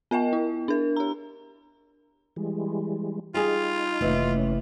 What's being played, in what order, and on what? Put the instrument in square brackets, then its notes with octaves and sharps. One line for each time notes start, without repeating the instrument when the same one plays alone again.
[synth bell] B3 A#4 D#5 G5
E4
D4 A#4
G4 A#5
[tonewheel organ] E3 G3 G#3
[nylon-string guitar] G3 G#4 [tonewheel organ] D#4 [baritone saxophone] F4
[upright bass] F1 A3 [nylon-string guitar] D#2 E3
[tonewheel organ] C#4